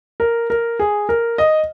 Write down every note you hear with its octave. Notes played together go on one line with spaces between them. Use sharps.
A#4
A#4
G#4
A#4
D#5